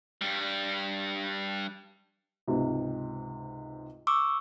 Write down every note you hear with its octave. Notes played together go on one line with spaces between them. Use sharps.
G2 G3
C#2 G#2 C3
C#6 D6 E6